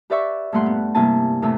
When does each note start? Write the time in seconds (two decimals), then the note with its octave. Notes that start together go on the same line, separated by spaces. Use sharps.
0.10 G4 B4 D5 E5 C#6
0.52 G2 A#2 A3 F#5 C6
0.66 B3
0.95 G2 C3 A#3 E4 G#5 A5
1.42 E2 A2 C3 A3 E6